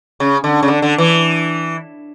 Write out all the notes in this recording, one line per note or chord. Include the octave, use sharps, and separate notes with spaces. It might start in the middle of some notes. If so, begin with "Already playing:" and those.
C#3
D3
C#3
D3
D3
E3